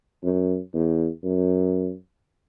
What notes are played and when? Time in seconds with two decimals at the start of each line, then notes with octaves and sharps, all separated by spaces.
0.23 F#2
0.74 E2
1.24 F#2